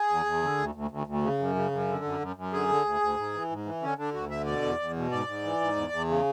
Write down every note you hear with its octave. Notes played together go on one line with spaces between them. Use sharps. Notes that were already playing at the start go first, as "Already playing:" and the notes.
Already playing: G#4
E2
E2
D3
D2
D2
D2
D2
C#3
F#2
C#3
F#2
D3
F#2
F#2
F#2
D3 G#4
D3
D2
D2
G#2
E3
G#2
E3
D3 C#4
D3 D4
D2 F#4
D3 E5
B2 D5
E2
E2
B2
G#2 D5
G#2
E3
G#2
E2
E2
C#3